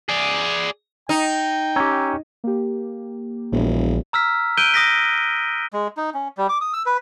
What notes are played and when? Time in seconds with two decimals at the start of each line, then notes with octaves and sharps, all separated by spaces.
0.09 G#4 D5
1.09 D#4 G5
1.76 C#4 G4 A#5 E6 G#6
2.44 A#3 G4
3.52 E1 A#1
4.13 A#5 E6 F6 B6
4.57 E6 F#6 G6 D7 D#7 G7
4.74 D#6 A#6 B6
5.73 G#3
5.97 D#4
6.14 C#4
6.37 G3
6.49 D6
6.61 D#6
6.73 E6
6.86 B4